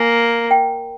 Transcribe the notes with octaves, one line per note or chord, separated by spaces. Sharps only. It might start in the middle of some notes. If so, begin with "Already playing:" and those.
Already playing: A#3 G#5
G5